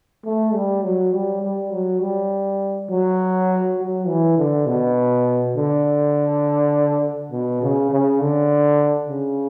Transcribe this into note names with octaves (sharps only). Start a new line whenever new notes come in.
A3
G3
F#3
G3
G3
F#3
G3
F#3
F#3
E3
D3
B2
D3
B2
C#3
C#3
D3
C#3